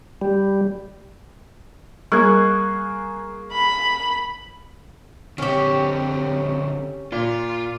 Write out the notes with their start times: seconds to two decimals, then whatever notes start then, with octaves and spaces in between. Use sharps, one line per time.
0.21 G3
2.12 G3 A#3 G#4 C#6 F#6 G#6
3.51 B5
5.38 D3 C4 C#4 G4
7.12 A#2 F4